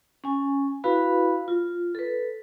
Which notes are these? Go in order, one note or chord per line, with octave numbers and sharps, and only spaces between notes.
C#4 G#5
E4 F#4 B4 F5 B5
F4
A4 B4